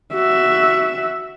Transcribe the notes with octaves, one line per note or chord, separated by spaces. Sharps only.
F#4 E5